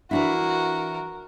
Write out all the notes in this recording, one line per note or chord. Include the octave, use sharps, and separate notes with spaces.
E3 D4 E4 F#4 A#4